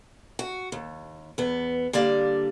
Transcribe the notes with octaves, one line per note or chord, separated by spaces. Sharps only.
F#4
D#2
E2 B3
D3 G3 A#3 D5